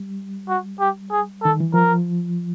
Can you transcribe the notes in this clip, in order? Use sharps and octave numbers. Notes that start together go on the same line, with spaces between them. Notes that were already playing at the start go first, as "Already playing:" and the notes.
Already playing: G3
F#4
G4
G#4
D#3 A4
E3
F3 A#4